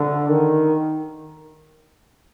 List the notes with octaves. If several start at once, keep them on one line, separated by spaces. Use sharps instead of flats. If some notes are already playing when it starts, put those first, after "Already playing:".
Already playing: D3
D#3